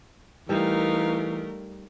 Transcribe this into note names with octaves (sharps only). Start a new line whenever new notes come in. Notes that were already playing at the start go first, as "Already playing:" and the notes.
E3 G3 A3 D#4 A#4 F5